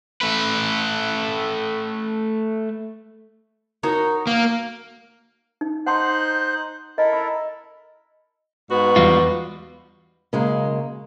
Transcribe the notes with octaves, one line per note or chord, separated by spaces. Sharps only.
A3 B4
D#4 F#4 A#4 C#5
A#3 A#4
D#4
D#4 C5 F#5 A5 C6 F#6
E4 A4 A#4 D#5
B5
G#2 B3 F#4
E2 G3 F4
C#3 F#3 G#3 A#3